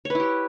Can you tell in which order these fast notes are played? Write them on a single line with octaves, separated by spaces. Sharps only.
C#5 B4 E4 G4